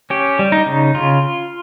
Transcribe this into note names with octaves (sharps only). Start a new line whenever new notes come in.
C#4 G4
G3
D#4
C#3
C#3 F4